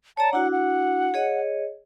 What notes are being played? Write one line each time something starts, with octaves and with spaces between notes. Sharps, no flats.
C#5 D5 A5 A#5
D4 E4 F#4 F#5
F#5
G#4 C#5 D#5